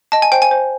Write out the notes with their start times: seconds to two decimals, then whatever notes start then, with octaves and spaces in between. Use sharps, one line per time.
0.12 D#5 A5
0.22 G#5
0.32 C5 G5
0.42 G#5
0.51 C5